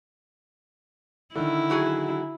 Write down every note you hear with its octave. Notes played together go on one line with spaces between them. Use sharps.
D3 D#3 E4
F#3 F#4 G#4